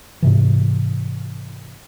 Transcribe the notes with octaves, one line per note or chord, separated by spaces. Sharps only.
G#2 C3 E3